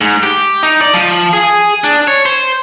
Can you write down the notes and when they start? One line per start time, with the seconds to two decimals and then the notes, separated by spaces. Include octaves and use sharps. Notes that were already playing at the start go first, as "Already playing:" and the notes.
0.01 G#2
0.23 G4
0.63 D#4
0.81 D5
0.94 F3
1.33 G#4
1.84 D4
2.08 C#5
2.25 C5